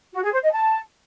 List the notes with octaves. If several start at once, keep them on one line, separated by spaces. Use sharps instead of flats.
F#4
G#4
C5
D#5
A5